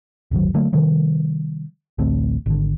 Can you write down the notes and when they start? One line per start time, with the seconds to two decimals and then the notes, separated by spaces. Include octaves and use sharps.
0.31 D1 G1 D#3 F#3
0.54 D3 F#3 A3 A#3
0.73 C3 D#3 F3 G3
1.98 A1 D2 A3 C4
2.46 G#1 D3